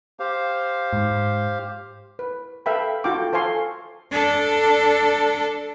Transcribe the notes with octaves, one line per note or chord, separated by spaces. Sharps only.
G4 C5 F5
G#2
B4
A4 B4 E5 F5 G5 B5
F4 F#4 A4 G5 D6
A4 C5 F5 G#5 C6 C#6
D4 A4